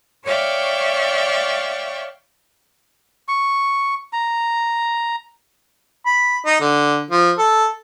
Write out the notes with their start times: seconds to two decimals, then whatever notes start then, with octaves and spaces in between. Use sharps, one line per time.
0.24 C#5 D5 E5 F5 G5 C#6
3.28 C#6
4.13 A#5
6.06 B5
6.46 D#4
6.61 D3
7.11 F3
7.39 A4